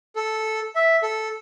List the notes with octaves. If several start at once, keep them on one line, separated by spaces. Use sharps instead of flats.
A4
E5
A4